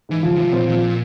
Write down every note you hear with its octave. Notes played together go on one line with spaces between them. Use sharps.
G#2 E3
C#3 F3
C3 F3
A#2 C4
F3